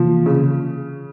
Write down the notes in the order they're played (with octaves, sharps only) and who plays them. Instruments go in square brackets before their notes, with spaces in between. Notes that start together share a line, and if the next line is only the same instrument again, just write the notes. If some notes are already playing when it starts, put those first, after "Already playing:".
Already playing: [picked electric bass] C3 E3 A#3 [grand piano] F3
[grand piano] C#3